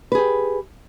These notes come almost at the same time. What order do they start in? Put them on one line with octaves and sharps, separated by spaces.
B4 G#4 G4